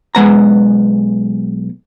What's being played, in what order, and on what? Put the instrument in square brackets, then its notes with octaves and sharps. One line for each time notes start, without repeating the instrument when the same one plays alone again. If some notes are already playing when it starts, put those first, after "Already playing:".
[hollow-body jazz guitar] B1 G#3 B3 A#5